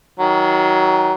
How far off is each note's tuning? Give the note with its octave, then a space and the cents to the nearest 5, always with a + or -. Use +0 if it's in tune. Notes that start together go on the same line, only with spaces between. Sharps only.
D#3 +35 F#3 +20